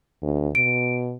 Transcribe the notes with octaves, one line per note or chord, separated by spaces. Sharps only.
D2
B2 D7